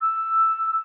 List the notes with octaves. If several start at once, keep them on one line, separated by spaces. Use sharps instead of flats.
E6